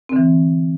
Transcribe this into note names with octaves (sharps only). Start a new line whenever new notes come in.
D3 E3 C4